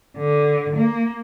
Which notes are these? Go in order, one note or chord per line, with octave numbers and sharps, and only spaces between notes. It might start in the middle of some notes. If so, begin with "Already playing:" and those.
D3
A#3